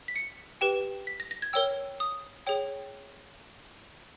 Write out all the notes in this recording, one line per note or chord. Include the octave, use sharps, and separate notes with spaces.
B6
C#7
G4 B4 G5
B6
A#6
A#6
G#6
A#4 C#5 G5 E6
D#6
G#4 C#5 G5